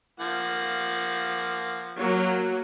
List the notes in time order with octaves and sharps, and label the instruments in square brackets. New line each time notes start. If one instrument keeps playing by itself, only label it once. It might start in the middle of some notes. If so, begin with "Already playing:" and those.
[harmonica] F3 A#3 F#5
[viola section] F#3 A#3